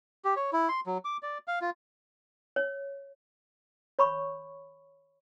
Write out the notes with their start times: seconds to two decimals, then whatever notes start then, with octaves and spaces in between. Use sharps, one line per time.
0.25 G4
0.37 C#5
0.53 E4
0.69 C6
0.86 F#3
1.05 D6
1.23 D5
1.48 F5
1.61 F4
2.56 C#5
3.99 C#5 B5 C#6